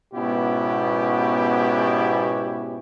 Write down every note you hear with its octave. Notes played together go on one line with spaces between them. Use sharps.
G#2 B2 B3 C#4 E4 G4